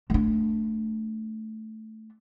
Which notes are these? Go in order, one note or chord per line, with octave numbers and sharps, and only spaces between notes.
A3 D4